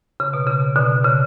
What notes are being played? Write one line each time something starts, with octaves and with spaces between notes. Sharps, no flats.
C#3
B2
C#3
B2 D3
C#3